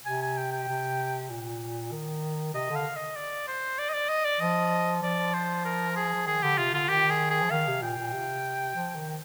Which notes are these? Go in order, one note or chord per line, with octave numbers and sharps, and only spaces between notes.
C3 G#5
G#5
G5
G5
C3
A#2
D#3
C3 D#5
D3
F5
D#5
D5
C5
D5
D#5
D5
D#5
D5
F3 D#5
F3 D5
C5
A#4
G#4
F3
D#3 G#4
D3 G4
C3 F4
D3 F4
D#3 G4
G#4
G#4
F3
D#3 F5
C3
A#2 G5
A#2
C3
F3
D#3